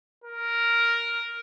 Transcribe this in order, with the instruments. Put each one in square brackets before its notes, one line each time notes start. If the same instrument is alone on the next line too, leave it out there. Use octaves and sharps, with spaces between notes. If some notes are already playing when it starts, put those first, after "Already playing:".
[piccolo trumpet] A#4